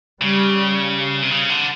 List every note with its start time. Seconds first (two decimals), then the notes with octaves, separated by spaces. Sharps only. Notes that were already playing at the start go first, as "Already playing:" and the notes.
0.22 C#3 G3
1.22 C3
1.31 C#3
1.50 D3